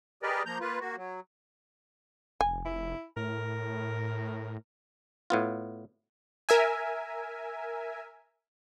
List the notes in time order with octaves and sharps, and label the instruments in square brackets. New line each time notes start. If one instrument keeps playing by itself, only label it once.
[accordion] G4 G#4 A#4 B4 D5 D#5
F3 A#3 A#5 G6
A#3 F4 B4
A#3 F#4
F#3
[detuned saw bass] F1 [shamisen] G#5
[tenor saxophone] E4
[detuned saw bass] A2 [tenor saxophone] A#4
[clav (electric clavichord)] A2 B3 F4
[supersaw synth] A#4 E5 G#5